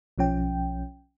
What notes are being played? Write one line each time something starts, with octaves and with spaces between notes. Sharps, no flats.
B1 F3 C#4 G5